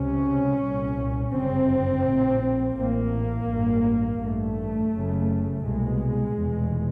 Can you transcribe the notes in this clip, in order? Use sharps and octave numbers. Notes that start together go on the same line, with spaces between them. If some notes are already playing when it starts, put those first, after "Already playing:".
Already playing: C#2 C3 C#4
C2 A#2
G1 F#2 C#3 C4
A#1 A2
A1 A2 A#3
A1 G2
A1 G2 A3
F#1 F#2 C#3
C2 B2 G#3
F1 E2 B2